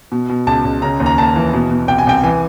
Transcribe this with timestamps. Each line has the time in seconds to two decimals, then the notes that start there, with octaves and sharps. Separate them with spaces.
0.12 B2
0.29 B2
0.47 C#2 A5
0.65 C#2
0.82 C#3 A#5
1.00 D#2
1.06 A#5
1.18 D#2 A5
1.36 E3
1.53 B2
1.71 B2
1.88 C2 G5
1.98 G#5
2.07 C2 G5
2.24 E3 G#5